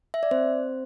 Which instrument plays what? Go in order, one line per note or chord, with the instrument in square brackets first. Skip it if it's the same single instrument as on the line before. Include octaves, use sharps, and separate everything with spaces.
[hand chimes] E5
D5
C4 C5